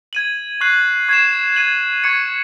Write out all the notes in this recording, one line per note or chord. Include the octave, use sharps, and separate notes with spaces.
G#6 D#7 F#7
C#6 F#6 C7 F#7
C#6 G#6 C7 E7
G#6 D#7 F#7
C#6 G#6 C#7